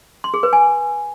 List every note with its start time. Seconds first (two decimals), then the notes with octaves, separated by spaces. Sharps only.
0.24 C6
0.34 G#4
0.43 B4
0.53 G#5